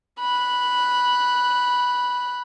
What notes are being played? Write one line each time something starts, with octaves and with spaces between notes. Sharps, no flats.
B5 F#6